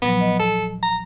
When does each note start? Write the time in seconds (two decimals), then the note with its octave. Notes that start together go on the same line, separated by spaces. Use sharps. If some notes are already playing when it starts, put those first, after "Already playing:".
0.02 A#2 F3 F#3 B3
0.21 D#5
0.39 A4
0.83 A#5